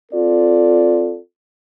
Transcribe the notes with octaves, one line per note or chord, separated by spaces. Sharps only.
C4 F4 A4 D5